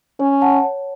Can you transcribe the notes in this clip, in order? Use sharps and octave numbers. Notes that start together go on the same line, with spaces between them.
C#4 C#5
F#5 A5
C#5